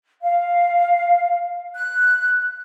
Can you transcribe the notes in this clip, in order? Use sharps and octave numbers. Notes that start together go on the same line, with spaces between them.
F5
F#6